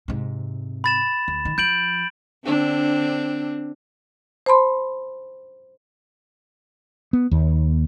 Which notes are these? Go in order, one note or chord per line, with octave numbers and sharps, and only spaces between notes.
G#2 C3
B5 A6 E7
D2
D#3
F3 G6 D7 F#7
D3 C4 D4
C5 A5 B5 C6
B3
D#2